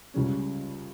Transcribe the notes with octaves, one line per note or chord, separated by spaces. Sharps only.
C#2 C#3 G3 C#4